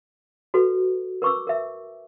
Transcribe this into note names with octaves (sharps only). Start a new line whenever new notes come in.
F#4 A4 B4
A#4 B4 C#6 D6 E6
A#4 E5